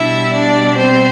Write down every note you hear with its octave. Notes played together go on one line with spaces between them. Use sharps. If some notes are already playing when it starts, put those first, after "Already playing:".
Already playing: B2 G3 D4 E4 E5
D4 D5
C4 C5